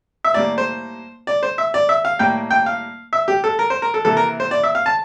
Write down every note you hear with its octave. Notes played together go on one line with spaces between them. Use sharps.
E5
A2 G3 A#3 D5
C5
D5
C5
E5
D5
E5
F5
A2 G3 A#3 G5
G5
F5
E5
G4
A4
A#4
C5
A#4
A4
C3 E3 A#3 A4
A#4
C5
D5
E5
F5
A5